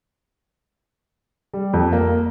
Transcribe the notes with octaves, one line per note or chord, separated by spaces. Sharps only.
G3
F2
A#3